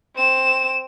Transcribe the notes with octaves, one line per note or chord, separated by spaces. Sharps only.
C4 E7